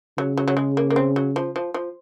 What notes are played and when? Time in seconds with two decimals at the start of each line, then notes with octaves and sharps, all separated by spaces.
0.18 C#3 F#3
0.38 F#3
0.48 F#3
0.57 G#3
0.77 A#3
0.90 A#3
0.96 C4
1.16 F#3
1.36 F3
1.56 F3
1.74 F3